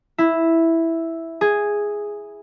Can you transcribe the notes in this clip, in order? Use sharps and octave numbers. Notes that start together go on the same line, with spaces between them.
E4
G#4